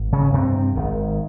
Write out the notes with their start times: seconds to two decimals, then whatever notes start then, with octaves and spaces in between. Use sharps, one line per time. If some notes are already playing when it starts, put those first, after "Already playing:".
Already playing: G#1
0.12 C#3 C#4
0.34 G2 C3 C4
0.55 C3 C4
0.76 G#1 D#3